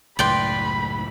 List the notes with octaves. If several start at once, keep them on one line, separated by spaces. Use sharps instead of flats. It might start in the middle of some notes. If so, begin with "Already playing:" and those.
C#2 F#2 A2 B4 D5 G5 B5 C6